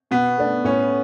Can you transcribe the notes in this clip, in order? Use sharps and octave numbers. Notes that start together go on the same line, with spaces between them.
B2 B3
A3 D4
A2 C#4